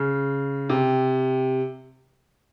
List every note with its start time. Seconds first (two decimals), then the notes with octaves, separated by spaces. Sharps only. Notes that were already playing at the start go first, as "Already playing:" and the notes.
Already playing: C#3
0.69 C3